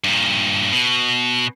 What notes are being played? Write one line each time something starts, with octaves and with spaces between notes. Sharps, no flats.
G2 A#2
B2